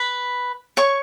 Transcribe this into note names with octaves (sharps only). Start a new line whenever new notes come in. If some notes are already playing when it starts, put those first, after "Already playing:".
Already playing: B4 B5
C#5 C#6